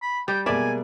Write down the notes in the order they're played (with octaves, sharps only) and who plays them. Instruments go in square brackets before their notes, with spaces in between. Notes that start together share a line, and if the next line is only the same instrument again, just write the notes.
[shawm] B5
[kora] G3 [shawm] G5
[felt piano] B2 G#3 A#3 [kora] D5 E5 [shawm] G#5